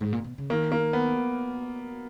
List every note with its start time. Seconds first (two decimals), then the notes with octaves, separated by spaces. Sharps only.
0.00 G#2
0.13 A#2
0.24 B2
0.38 C#3
0.50 D#3 A#3
0.72 A#3
0.93 B3